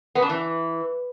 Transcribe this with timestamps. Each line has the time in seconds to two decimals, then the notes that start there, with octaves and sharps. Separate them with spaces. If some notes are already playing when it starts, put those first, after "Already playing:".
0.15 B3
0.22 D4
0.29 E3